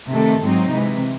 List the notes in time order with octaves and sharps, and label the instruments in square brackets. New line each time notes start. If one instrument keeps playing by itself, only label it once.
[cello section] C3 D#3 A3 A4
G#2 F#3 C4 D#4
C3 E3 G#3